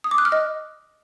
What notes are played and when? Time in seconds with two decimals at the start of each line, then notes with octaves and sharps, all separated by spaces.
0.04 D#6
0.11 D6
0.18 F#6
0.25 F6
0.32 D#5